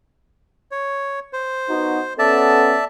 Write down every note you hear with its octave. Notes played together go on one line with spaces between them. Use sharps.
C#5
C5
B3 D#4 F#4
B3 C#4 A4 D5 E5 A5